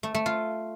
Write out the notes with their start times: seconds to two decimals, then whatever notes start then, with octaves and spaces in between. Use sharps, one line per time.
0.03 A3
0.15 A3
0.26 F4